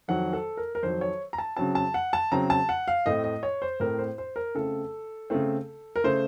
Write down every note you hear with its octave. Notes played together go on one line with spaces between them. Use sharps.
F2 D#3 F#3 F#5
A4
A#4
A#4
F2 D#3 F#3 C5
C#5
A#5
A5
C#3 F#3 C4 A5
A5
F#5
A5
C#3 F#3 C4 A#5
A5
F#5
F5
A2 A3 C4 D#5
D#5
C#5
C5
A2 A3 C4 A#4
C5
C5
A#4
C#3 A3 C4 A4
C#3 A3 C4
A#4
C#3 A3 C5